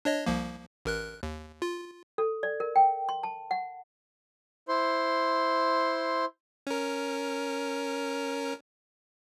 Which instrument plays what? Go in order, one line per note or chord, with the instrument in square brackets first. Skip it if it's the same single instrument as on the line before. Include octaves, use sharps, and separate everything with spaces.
[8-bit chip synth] D4 C#5 D#5
C2 F3 A#3
A1 A#4 F#6
D#2
F4
[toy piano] A4
D5
A#4
G5
C6
A5
F#5
[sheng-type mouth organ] E4 C5 C6
[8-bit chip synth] C#4 A#4